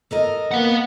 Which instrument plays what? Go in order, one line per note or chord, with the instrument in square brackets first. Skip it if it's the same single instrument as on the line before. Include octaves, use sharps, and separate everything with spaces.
[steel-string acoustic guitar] A4 A#4 D#5
[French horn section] A#3 [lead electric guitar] B4 F#5